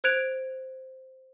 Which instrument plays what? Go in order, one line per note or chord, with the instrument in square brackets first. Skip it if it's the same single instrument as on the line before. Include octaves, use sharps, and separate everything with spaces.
[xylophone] C5 F#6 G#6 D7 F7